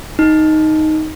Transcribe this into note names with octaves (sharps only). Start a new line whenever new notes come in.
D#4